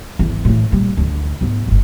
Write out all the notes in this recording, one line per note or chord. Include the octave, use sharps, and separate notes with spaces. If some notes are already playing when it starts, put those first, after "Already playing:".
G#1 E2
A2 E3
A#2 G3
D2 D3
G#2 B3
D1 G1